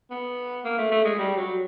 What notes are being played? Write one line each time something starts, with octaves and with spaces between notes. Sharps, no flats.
B3
A#3
A3
A3
G#3
G3
F#3